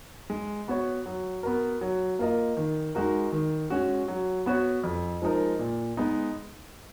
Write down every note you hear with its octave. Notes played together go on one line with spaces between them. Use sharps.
G#3
B3 F#4 C#5
F#3
B3 F#4 A#4
F#3
A#3 F4 A#4 D#5
D#3
G#3 D#4 F#4 A#4
D#3
G#3 C#4 F#4
F#3
B3 F#4 C#5
F2
F3 G#3 D#4 A#4
A#2
G#3 B3 D#4